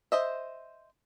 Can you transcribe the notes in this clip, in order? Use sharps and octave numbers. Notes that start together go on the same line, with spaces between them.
C5 D#5 E5